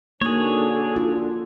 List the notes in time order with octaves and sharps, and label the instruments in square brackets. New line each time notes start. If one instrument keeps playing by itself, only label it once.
[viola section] D3 D4 [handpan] A#3 [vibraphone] D#4 F#4 [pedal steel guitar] G#4 C#5
[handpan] F4